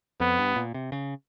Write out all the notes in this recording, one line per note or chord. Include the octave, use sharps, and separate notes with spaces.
F2 B3
G2
A#2
C3
C#3